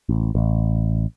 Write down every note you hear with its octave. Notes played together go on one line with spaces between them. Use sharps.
A1
A1